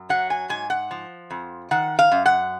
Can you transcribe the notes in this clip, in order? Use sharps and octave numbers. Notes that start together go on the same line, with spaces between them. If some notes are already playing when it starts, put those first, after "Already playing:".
Already playing: F#2
F#3 F#5
G#5
G#2 G#5
F#5
F3
F2
D#3 F#5
F5
F#2
F#5